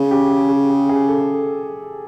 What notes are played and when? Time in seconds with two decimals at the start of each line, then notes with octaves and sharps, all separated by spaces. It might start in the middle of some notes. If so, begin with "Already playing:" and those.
Already playing: C#3 G#4
0.11 G4
0.30 G#4
0.50 G4
0.70 G#4
0.89 G#4
1.08 A4